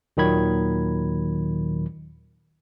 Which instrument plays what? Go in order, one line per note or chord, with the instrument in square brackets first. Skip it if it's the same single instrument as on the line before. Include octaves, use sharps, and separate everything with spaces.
[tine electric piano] D#2 A#2 D#3 F#3 B5 G#6